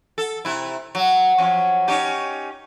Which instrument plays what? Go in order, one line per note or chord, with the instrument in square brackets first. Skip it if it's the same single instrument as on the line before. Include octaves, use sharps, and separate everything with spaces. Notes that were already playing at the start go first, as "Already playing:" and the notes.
[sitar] A4
C3 E4
F#3
F3 F#3 C#4
C#4 D#4 G4